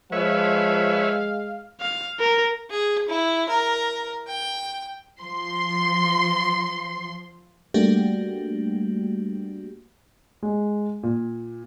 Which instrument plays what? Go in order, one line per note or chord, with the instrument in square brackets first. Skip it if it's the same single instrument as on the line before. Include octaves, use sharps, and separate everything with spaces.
[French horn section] F3 [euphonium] G#3 [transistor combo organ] B4 C#5 E5 [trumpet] F5
[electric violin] F5
A#4
[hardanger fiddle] G#4
E4
A#4
G5
[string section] F3 C6
[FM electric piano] G3 A3 A#3 D4 F#4 G4
[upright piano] G#3
A#2